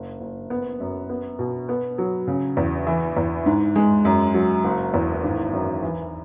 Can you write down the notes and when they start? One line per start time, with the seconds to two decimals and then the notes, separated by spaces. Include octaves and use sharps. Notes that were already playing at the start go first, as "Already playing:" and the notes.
Already playing: F#1
0.21 F#1
0.50 B3
0.80 F#2
1.10 B3
1.39 B2
1.69 B3
1.98 F#3
2.27 C#3
2.57 E2
2.87 E3
3.17 E2
3.46 G#2
3.76 G#3
4.05 F#2
4.35 F#3
4.64 F#1
4.94 E2
5.24 G#1
5.53 F#2
5.83 E3